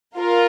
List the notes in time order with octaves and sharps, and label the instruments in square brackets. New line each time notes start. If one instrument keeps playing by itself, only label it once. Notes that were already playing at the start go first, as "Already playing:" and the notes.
[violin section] F4 A#4